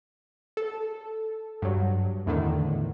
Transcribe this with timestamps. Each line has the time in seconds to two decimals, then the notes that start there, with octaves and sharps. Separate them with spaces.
0.57 A4
1.62 G2 F#3
2.26 E2 A2 D3 D#3